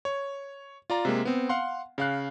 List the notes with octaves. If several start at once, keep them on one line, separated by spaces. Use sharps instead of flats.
C#5
F4 D5 A#5
C3 G#3 A#3
B3 C4
F5 F#5 C6
C#3 F5 F#6